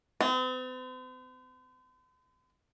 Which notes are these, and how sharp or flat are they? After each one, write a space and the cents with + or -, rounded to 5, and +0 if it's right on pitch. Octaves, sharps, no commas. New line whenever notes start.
C4 -45